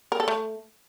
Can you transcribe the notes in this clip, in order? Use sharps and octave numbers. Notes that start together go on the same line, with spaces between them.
A#4
A4
A3